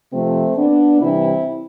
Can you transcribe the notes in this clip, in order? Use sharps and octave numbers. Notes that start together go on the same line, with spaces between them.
C3 F3 A3 C4
B3 D4
C3 E3 G3 C4 E4